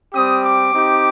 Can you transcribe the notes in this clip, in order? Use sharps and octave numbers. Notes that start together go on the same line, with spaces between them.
G3 C4 G4 D#6
D6
C4 D#4 G4